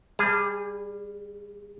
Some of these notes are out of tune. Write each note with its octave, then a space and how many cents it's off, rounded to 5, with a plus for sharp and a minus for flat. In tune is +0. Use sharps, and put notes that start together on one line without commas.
G3 +15 G#4 -20 A5 +10